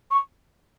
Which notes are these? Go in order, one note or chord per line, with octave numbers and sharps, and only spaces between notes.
C#6